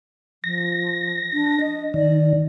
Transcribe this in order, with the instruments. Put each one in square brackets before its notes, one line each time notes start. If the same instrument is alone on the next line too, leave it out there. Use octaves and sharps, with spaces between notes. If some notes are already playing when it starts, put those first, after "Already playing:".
[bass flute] F3 [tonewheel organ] A#6
[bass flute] D4
D#5
[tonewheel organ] D#3 [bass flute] D5